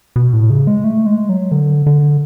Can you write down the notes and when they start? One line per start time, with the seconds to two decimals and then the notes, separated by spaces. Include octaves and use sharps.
0.16 B2
0.33 A2
0.50 C#3
0.67 G#3
0.84 A3
1.06 G#3
1.29 F#3
1.52 D3
1.87 D3